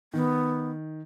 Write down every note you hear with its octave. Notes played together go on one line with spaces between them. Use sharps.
D#3 B3